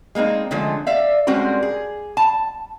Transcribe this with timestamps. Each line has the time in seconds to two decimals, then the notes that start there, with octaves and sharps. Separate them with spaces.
0.15 G#3 A#3 C4 D#4
0.51 D3 F3 G#3 A3 C#4
0.87 D5 E5 F5
1.27 G3 G#3 C4 C#4 F#4 A#4
1.63 G#4
2.17 A5